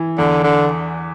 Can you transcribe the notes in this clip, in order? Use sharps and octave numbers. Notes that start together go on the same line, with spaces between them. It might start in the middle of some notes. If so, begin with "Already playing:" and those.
Already playing: E3
E2 D3
D3